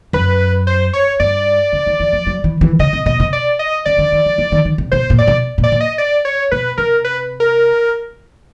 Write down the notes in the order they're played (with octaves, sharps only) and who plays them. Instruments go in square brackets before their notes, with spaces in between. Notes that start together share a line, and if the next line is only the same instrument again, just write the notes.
[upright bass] F#2 [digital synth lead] B4
[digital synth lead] C5
C#5
[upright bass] G2 [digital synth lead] D5
[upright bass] C#3
D#3
E3
F3
F#3
E3
E3
[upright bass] C#3 [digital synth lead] D#5
[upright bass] C3
[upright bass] B2 [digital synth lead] D#5
[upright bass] C3
[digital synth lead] D5
D#5
[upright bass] C#3 [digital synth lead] D5
[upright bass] D3
D#3
E3
E3
D#3
D#3
C3
[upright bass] B2 [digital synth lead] C5
[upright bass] A#2
[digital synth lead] D5
[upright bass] B2
A#2
[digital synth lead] D5
[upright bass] A#2
[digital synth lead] D#5
D5
C#5
[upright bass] B2 [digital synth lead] B4
[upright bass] C3 [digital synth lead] A#4
[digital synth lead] B4
A#4